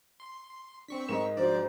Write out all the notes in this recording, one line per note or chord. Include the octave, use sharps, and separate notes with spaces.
C6
C4 D4 C#6 B6
G#2 A#4 D#5 E7
F3 D4 F#4 C5 D5